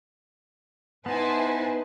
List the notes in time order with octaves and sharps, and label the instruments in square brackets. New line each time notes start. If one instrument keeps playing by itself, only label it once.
[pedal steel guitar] B3 D#4 [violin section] E4 G#5 A5 [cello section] B4 C5